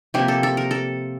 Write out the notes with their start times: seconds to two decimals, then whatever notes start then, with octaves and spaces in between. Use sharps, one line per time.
0.14 C3 F3 A#3 G4
0.28 A4
0.43 A4
0.57 A#4
0.71 A4